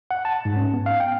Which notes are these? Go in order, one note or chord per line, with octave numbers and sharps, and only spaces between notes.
F#5
A5
G#2
C#4
B3
F5
G5